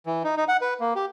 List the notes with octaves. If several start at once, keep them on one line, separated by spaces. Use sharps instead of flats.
E3
D#4
D#4
F#5
B4
A#3
G4